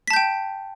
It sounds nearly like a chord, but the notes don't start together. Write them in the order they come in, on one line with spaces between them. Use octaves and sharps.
B6 A5 G6 G5